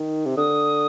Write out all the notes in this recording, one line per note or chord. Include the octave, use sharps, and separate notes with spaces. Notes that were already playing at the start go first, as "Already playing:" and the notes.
Already playing: D#3
C3
D3 D#6